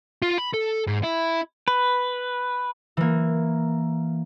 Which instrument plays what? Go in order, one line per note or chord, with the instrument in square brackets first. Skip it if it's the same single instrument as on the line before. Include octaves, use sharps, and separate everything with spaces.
[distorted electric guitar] F4
B5
A4
G#2
E4
[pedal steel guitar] B4
[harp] E3 A#3